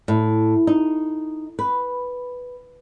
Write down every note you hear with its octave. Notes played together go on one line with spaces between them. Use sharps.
A2
D#4
B4